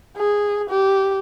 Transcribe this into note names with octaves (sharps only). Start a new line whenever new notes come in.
G#4
G4